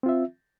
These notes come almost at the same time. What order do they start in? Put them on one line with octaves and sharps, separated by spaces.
C4 F4 E5